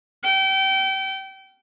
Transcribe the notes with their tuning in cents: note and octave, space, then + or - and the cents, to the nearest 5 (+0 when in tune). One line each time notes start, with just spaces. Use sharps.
G5 -30